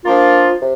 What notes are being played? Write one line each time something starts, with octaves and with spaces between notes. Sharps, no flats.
F3 A#3 D4 F4
C3